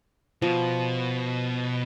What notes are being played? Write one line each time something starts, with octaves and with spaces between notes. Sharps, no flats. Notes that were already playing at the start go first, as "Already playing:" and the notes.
B2 F3